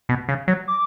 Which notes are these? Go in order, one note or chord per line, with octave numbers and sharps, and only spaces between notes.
B2
C#3
F#3
D6